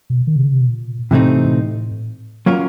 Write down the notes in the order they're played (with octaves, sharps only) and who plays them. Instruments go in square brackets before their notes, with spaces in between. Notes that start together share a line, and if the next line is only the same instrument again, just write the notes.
[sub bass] B2
D#3
C3
C#3
C3
B2
A#2
[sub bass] A2 [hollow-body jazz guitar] C3 E3 A3 C4 D#4
[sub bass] A2
[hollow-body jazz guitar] F#3 A#3 C#4 F4 A#4